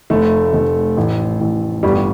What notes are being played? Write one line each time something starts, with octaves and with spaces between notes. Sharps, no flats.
F1 A3
F1
A1
A1
G1 G3